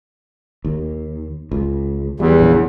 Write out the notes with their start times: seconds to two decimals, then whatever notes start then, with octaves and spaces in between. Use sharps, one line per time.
0.65 D#2
1.52 C#2
2.20 E2 G3
2.39 A#1 C#3